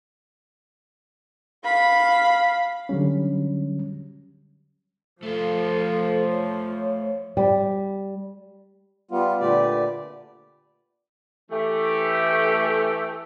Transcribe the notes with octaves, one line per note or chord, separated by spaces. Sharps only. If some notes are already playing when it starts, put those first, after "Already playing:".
F5 B5
D3 F#3 G3 C#4
F3 A3 F4 A4
C#5
G3
G3 B3 F4
A#2 D3 A3 G4 B4 D5
E3 A3 G4